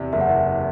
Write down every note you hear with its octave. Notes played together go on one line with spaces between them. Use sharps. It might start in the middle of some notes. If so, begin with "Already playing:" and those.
Already playing: E2 C3 D5 E5
F#1 E5
F#5
E5